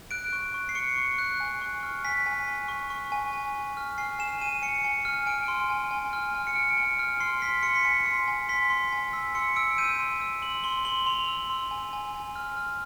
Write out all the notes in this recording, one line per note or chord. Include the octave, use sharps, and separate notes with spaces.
F#6 D7
C#6
C#6
C7
C#6 C#7
C#6
F#6
G#5
C#6
F6
G#5 B6
G#5
G#5
C#6
C#6
G#5
G#5
G#5
F6
G#5 C7
G#5 E7
G#5 D#7
G#5 C#7
G#5
F6
G#5 D7
C6
G#5
G#5
F6
G#5
C#7
F6 D7
G#5
F6
C6 C7
C6 B6
C6 C#7
B6
G#5 C7
C6
G#5
C6 B6
C6
G#5
E6 B6
C6 C#7
E6 D7
G6 D#7
C6
E6
C6 F#7
C6 G7
C6 F#7
C6 F7
E6
C6
G#5
G#5
G#5
F6
F6